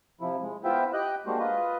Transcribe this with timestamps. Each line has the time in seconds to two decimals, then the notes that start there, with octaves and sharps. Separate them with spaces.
0.21 C3 F3 E4
0.42 G#3
0.64 B3 E4 F4 C5 E5 G5
0.93 G4 D#5 G5 F#6
1.27 G#3 A#3 D4 F#4 G4 C5
1.39 F4 B4 D#5